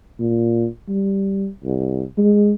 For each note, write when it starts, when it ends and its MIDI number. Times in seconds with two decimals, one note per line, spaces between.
0.19 0.67 46
0.88 1.47 55
1.64 2.03 36
2.17 2.53 56